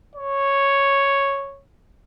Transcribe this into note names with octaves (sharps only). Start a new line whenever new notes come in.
C#5